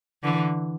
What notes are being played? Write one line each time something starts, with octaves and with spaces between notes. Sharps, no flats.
D3 E3